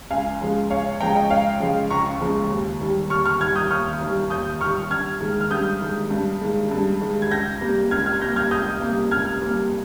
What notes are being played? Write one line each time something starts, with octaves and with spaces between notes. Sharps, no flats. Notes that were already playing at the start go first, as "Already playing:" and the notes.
C#2 F5 G#5
C#3 F3 G#3
C#2 C#5 F5
C#5
C#3 F3 G#3 G5 A#5
D#5 G5
C#2 C#5 F5
C#3 F3 G#3
C#2 A#5 C#6
C#3 F3 G#3
D#2
D#3 G3
D#2 C#6 F6
C#6 F6
D#3 G3 F6 G#6
D#6 G6
D#2 C#6 F6
D#3 G3
D#2 D#6 G6
D#3 G3 C#6 F6
G2 F6 G#6
D#3 G#3
F6
G2 D#6 G6
D#3 G#3
G2
D#3 G#3
G2
D#3 G#3
G#6
C#2 G6 A#6
C3 G3 A#3
C#2 F6 G#6
F6 G#6
C3 G3 A#3 G6 A#6
F6 G#6
C#2 D#6 G6
C3 G3 A#3
C#2 F6 G#6
C3 G3 A#3